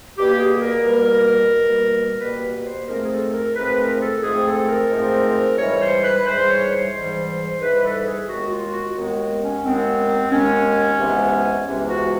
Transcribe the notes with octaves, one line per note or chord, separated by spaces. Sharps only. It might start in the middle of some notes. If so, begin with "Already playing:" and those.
B2 G3 A#3 G4
G#4
A#4
B2 G3 A#3
B2 G3 A#3
B2 G3 A#3 B4
C5
G#2 F3 A3 C4 A#4
G#4
A4
A#4
G#2 F3 A3 C4 B4
A#4
A4
G#2 F3 A3 C4 G#4
A4
A#4
G#2 F3 A3 C4
G#2 E3 G3 C#5
C5
B4
G#2 E3 G3 C5
C#5
C5
G#2 E3 G3
G#2 E3 G3 B4
A4
G#4
D#2 D#3 G#3 B3 F#4
F4
F#4
D#2 D#3 G#3 B3
C#4
D#2 D#3 G#3 B3 C4
D#2 D#3 G#3 B3 C#4
C#2 C3 E3 G#3 B3
C#2 C3 E3 G#3 B3
F#4